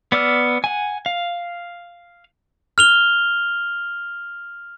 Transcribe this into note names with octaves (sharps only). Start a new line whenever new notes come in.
B3 D5 E6 F6
F#5 G#5
F5
F6 F7 G7